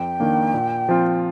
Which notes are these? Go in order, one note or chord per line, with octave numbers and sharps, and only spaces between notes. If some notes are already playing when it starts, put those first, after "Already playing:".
Already playing: F2 G5
D#3 A#3 D4
A#2
F3 C4 F4